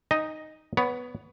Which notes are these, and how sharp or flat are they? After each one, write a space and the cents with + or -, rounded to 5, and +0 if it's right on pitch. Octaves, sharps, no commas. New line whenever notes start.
D#4 +0 D#5 +0 G#5 -35
B3 +0 C#5 +25